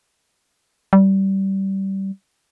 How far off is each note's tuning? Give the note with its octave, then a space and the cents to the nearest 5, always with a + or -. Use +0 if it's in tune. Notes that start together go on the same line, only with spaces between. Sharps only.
G3 -20